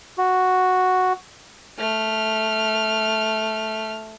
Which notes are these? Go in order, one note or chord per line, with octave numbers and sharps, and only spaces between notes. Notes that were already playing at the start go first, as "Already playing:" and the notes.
F#4
A3 F6